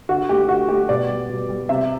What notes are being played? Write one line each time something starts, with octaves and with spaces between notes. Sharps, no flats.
D3 F#4
A3 G4
D3 F#4
A3 G4
B2 D5
G3
B2
G3
C3 E5